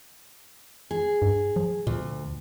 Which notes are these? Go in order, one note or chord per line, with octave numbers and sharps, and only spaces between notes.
G#4
G2
F3
D2 A#2